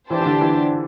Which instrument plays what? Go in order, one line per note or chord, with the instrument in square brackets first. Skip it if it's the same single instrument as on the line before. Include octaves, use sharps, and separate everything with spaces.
[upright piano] E3 [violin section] D4 G4 C5 A5
[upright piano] E3
D3
E3